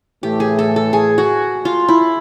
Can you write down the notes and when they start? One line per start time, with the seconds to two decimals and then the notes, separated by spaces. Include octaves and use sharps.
0.23 A2 E3 A3 G4
0.40 G#4
0.59 A4
0.76 A4
0.93 G#4
1.18 F#4
1.65 F4
1.89 E4